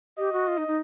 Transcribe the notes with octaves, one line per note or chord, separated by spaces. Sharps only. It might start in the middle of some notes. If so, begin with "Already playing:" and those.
G4 D#5
F#4
F4
D#4
D#4